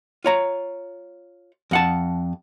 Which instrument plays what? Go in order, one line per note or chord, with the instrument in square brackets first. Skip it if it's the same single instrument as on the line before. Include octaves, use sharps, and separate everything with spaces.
[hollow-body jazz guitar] F4 C#5 A#5
F2 F#5 A5